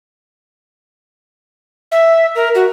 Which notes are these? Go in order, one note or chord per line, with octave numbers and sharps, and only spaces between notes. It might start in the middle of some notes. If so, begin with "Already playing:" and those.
E5
A#4
F#4